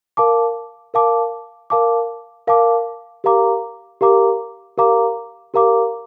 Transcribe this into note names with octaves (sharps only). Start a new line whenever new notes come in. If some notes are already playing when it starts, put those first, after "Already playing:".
A#4 F5 A5 D6
A#4 F5 A5 D6
A#4 F5 A5 D6
A#4 F5 A5 D6
G4 A#4 F5 A#5 D6
G4 A#4 F5 A#5 D6
G4 A#4 F5 A#5 D6
G4 A#4 F5 A#5 D6